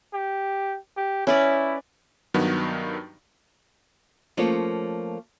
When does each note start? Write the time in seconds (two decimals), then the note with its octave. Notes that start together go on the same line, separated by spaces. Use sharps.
0.13 G4
0.96 G4
1.27 C#4 E4 B4 D5
2.34 G2 D#3 F#3 B3
4.37 F3 A3 A#3 C#4 F4 C#5